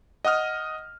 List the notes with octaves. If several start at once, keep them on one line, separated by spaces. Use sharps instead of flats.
D#5 F#5 D#6 F6